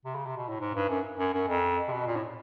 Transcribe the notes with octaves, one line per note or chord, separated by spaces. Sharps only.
C3
C#3
C3
B2
A2
G#2
G2
F#2
F#2
F#2
F2
C3
B2
A#2
A2